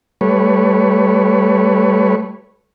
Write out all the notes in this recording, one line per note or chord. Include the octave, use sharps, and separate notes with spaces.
G3 A3 B4 C#5